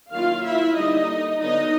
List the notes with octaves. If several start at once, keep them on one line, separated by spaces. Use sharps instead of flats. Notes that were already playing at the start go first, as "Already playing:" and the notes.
D#3 F#3 A#3 C#4 E4 F4 F5
E4 E5
D3 G3 A#3 D#4 D#5
D3 F#3 B3 D#4 D#5